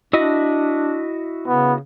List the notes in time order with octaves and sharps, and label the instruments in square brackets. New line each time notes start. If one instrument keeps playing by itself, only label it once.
[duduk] D4 [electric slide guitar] E4 F#4 D#5
[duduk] C#3 [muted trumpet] B3